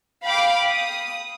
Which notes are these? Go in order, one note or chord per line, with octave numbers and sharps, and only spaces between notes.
F5 G5 B5 D6
D#6